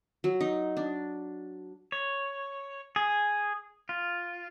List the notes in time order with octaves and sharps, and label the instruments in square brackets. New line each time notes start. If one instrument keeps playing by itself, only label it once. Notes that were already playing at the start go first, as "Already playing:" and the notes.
[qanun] F#3
D#4
D4
[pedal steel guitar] C#5
G#4
F4